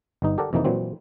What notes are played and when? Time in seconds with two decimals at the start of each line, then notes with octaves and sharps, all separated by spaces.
0.22 G1 G2 D#4
0.38 G4 A4 A#4 D5 F#5
0.53 F2 C3 E3 A#3 D#4
0.65 A#2 E3 F#3 C4